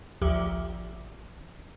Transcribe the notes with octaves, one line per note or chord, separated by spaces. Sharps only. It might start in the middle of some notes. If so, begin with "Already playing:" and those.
A1 D2 F3 G4 E5 D6